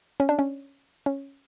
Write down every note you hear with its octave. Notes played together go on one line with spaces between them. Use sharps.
C#4
D4
C#4
C#4